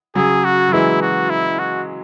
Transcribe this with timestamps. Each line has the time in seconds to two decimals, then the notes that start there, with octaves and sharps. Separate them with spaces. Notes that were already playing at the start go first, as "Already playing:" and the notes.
0.15 C#3 F#3 G#4
0.44 F#4
0.69 F#3
0.72 E3 G#3 E4
1.02 F#4
1.30 E4
1.59 F#4